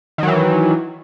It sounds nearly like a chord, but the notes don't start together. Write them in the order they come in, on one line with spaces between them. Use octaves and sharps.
D#3 F#3 E3